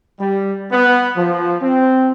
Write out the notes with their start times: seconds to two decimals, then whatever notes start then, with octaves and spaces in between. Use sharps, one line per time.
0.20 G3
0.72 B3
1.16 F3
1.62 C4